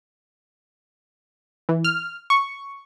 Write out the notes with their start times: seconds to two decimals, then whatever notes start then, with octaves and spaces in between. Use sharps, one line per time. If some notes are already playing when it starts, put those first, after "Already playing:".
1.69 E3
1.84 F6
2.30 C#6